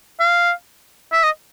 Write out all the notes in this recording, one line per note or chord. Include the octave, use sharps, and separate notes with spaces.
F5
E5
D#5